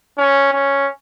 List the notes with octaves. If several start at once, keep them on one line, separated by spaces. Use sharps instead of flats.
C#4
C#4